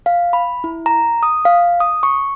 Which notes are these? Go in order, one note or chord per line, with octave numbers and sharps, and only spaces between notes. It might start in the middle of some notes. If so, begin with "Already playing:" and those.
F5
B5
E4
A#5
D#6
F5
D#6
C#6